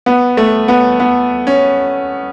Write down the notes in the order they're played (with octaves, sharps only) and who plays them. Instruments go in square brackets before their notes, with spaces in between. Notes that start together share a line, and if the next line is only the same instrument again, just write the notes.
[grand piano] B3
A3
B3
B3
C#4